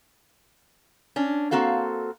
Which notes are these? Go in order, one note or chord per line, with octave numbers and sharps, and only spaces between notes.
C#4 D4
A#3 C4 F#4 A4 F5